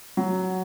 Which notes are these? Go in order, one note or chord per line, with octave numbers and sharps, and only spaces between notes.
F#3